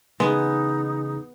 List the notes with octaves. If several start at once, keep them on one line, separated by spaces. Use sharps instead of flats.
C#3 E3 G#3 B3 D#4 G#4